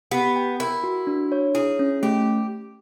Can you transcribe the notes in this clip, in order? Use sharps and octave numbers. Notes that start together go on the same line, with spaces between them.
B3 G4
G5
E4 A#4
F#4
D4
C#5
E4 G#4
C#4
A3 G4